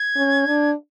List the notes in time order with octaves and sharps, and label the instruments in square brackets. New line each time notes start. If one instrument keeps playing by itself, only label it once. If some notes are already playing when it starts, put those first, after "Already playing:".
Already playing: [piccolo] G#6
[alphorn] C#4
D4